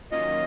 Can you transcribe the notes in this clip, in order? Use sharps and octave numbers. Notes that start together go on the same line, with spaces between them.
D#3 F#3 A#3 C#4 F4 D#5